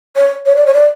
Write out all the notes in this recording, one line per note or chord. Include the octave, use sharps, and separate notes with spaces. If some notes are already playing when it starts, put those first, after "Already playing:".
C#5
C#5
D5
C#5
D5